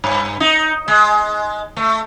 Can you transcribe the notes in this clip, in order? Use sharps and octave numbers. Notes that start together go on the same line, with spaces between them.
G2
D#4
G#3
A3